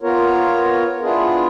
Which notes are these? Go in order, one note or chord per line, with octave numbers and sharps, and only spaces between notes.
B3 F4 A#4 C#5
B3 D4 E4 F4 G#4